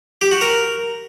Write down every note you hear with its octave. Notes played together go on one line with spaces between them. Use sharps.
G4
F#4
A#4